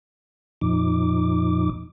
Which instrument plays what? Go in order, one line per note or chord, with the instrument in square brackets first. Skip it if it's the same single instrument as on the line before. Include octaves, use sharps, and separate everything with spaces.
[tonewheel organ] F2 A#2 F3 D#4 D6